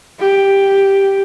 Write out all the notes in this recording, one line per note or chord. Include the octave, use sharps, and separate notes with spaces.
G4